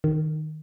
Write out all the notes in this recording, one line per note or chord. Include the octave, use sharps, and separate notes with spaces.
D#3